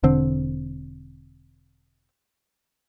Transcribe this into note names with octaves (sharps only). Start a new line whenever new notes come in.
E1 D3 C4